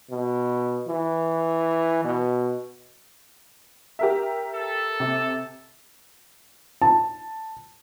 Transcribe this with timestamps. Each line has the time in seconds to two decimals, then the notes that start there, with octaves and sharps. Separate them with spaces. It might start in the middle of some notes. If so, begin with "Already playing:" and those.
0.10 B2
0.87 E3
2.04 B2
3.99 G4 A#4 E5
4.53 A4
5.00 C3
6.82 A5